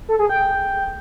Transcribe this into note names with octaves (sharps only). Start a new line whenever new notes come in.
A4
G#4
G5